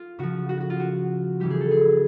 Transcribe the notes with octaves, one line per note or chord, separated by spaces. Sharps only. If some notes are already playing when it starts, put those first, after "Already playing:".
Already playing: F4
C#3 F3 F#4
F#4
F#4
F4
F#4
C#3 E3 G3 G4
G#4
A4
G#4